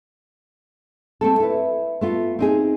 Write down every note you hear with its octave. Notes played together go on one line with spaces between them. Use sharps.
A3 C4 A4
E4 B4
A3 B3 F4
C4 D#4 G#4